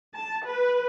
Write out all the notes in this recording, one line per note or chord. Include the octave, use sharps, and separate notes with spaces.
A5
B4